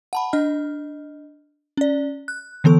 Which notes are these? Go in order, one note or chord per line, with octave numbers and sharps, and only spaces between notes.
F#5 A5 B5
D4 D#5 F6
C#4 D5
F#6
D3 E3 B3 A4 C#6